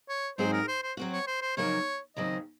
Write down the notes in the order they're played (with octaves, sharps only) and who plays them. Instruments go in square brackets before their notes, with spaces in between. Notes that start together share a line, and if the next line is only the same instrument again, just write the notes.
[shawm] C#5
[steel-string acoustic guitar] G#2 F#3 C4 D#4 G#4 [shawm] C5
[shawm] A#4
C5
C5
[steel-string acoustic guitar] F#3 C4 F#4
[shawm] C#5
C5
C5
[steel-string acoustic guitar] F2 C#3 F#3 A#3 D#4 [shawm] C#5
[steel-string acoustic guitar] D#2 C#3 F#3 C4 [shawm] D#5